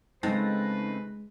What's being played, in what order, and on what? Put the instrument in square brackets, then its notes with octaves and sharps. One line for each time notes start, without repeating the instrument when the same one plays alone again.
[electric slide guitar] C#3 A3 C4 [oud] G#3 [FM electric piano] D#4 A5 A#6 [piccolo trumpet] B4